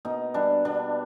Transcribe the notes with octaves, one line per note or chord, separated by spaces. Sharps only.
B2 D#4
G3 D4
B2 D4